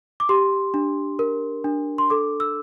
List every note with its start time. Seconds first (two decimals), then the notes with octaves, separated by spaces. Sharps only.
0.20 D6
0.29 G4 C6
0.74 D4
1.19 A#4
1.64 D4
1.98 C6
2.10 A4 D6
2.40 E6